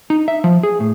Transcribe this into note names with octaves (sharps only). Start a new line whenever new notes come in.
D#4
E5
F3
G#4
A2